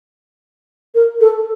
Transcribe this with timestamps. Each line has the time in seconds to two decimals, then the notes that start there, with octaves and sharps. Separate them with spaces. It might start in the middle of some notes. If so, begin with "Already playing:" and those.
0.95 A#4
1.21 A4